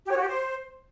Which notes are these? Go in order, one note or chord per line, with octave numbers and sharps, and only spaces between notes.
G4
C#5
F#4
G4
C5